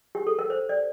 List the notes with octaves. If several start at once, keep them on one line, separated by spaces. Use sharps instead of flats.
G4
A4
A#4
C5
D5